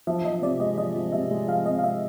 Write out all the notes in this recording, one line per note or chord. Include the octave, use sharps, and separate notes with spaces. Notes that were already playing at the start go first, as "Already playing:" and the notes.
F3 E5
F3 D#5
C3 D5
G#3 D#5
F3 D#5
F3
C3 E5
G#3
F3 F5
C3 D#5
F5
G#3 E5